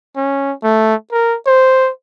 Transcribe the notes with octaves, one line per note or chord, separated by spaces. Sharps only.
C#4
A3
A#4
C5